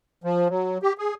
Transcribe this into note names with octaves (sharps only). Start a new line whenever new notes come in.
F3
F#3
G4
G#4